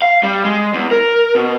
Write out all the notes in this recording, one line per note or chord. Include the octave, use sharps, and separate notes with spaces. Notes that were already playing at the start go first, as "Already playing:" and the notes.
F5
G3
G#3
E2
A#4
B2